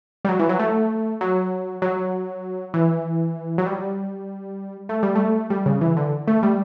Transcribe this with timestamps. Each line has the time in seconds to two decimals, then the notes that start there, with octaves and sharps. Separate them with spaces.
0.25 G3
0.29 F#3
0.39 E3
0.49 F#3
0.59 A3
1.21 F#3
1.82 F#3
2.74 E3
3.58 F#3
3.66 G3
4.89 A3
5.03 G3
5.15 A3
5.50 G3
5.66 C#3
5.81 E3
5.97 D3
6.28 A3
6.43 G3